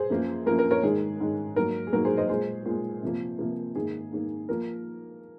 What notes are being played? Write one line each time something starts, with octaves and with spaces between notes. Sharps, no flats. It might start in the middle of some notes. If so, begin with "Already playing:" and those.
Already playing: G#4 C5
F#2 F3 A#3
F#2 F3 A#3 A#4
A#4
A#4 C#5
G#2 D#3 G#3 G#4
G#2 D#3 G#3
G#2 F#3 A#3 A#4
G#4
G#2 F#3 A#3 A#4
G#4 C5
C5 D#5
A#2 G#3 G#4 C5
A#2 G#3
C3 F3 A#3
C3 F3 A#3
G#2 D#3 A#3 G#4
G#2 D#3 A#3
F3 A#3 A#4